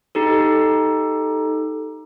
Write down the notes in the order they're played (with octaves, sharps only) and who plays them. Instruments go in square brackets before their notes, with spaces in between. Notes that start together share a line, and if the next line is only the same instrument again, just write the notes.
[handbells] D#4 G4 A4